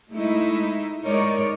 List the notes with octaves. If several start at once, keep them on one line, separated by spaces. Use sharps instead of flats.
G#3 A3 D#4 E4
G#3 D#4 A#4 C#5 D5